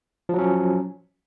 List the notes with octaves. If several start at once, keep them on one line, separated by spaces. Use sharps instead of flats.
F3 F#3 C#4